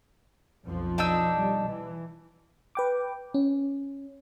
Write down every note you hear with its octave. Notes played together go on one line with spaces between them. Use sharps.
B1 F2 F3
D4 D#4 E6
G3
E3
B4 G5 D6
C#4